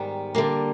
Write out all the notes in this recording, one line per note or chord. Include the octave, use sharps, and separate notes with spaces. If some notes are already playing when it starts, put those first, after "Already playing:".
Already playing: G#2 D#3 G3 B3
D3 G3 A#3